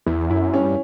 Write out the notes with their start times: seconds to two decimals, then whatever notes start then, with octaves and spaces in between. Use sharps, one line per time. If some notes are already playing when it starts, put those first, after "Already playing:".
0.06 E2 E4
0.30 F#2 E4
0.54 G2 C#4